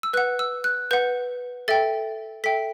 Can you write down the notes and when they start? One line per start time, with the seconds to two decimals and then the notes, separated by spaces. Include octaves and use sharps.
0.03 E6
0.13 B4 F#6
0.17 F#5
0.39 E6
0.64 F#6
0.91 B4 F#5 G6
1.68 A4 E5 G5 A6
2.44 A4 E5 G5 B6